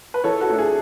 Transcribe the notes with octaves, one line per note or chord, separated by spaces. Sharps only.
B4
E3 A4 C#5
F#4 A4
A3 D4
G#4